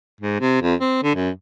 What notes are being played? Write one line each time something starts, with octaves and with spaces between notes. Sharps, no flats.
G#2
C3
F2
C4
D3
F#2